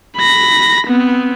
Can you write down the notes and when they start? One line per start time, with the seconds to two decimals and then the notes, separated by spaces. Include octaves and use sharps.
0.17 B5 A#6
0.87 B3 C4